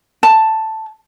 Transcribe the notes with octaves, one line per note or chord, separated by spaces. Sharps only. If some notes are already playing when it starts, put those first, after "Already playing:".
A5